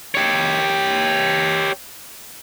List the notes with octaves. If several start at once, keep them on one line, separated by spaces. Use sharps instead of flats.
G4 C#5